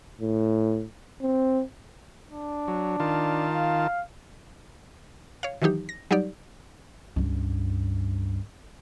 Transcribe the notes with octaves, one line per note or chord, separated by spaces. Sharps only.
A2
C4
D4
F#3
D#3 F4 A5
F5
C#5 F5
D#3 E3 F#3 D#4 G4
A#6
F#3 G3 D#4 G4 D5
C#2 G2